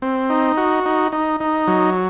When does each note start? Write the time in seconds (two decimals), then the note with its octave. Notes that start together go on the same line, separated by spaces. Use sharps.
0.02 C4
0.30 D#4
0.57 F#4
0.86 D#4
1.12 D#4
1.40 D#4
1.68 F#3